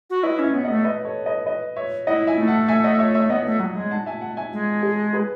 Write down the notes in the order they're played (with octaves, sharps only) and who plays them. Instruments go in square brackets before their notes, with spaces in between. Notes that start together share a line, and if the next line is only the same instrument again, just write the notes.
[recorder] F#4
[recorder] E4 [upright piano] B4 D#5
[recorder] C#4 [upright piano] C#5 E5
[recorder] B3
[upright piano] D#5 F#5
[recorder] A3
[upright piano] E5
B4 D#5
A4 C#5
B4 D#5
B4 D#5
C#5 E5
[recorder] E4 [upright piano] D#5 F#5
[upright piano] E5 G#5
[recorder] A3
[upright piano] F#5 A5
E5 G#5
D#5 F#5
C#5 E5
C#5 E5
[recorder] B3 [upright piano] D#5 F#5
[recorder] A3
F#3
G#3
[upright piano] F#5 A5
E5 G#5
F#5 A5
E5 G#5
[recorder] G#3
[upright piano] G#4
G#4 B4